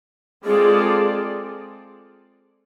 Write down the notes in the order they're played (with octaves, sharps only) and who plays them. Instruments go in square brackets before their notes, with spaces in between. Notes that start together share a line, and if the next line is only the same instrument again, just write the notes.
[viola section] G#3 C4 F4 A4 D5 [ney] G#4